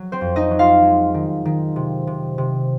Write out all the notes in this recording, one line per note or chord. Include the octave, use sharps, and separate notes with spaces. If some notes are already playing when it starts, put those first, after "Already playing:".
Already playing: F#3
C4 C5
F2
D#4 D#5
F#3
F4 F5
G#3
D#3
D#3
C3
C3
C3